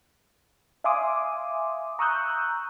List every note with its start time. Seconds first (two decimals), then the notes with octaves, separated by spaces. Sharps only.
0.84 E5 F5 G#5 C6 D6 D#6
1.99 A#5 C#6 D#6 E6 F#6 G6